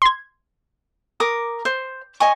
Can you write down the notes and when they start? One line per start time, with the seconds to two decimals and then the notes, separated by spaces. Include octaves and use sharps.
0.02 C6 G#6
1.20 A#4 D6 D#6
1.65 C5
2.20 D#5 G#5 C#6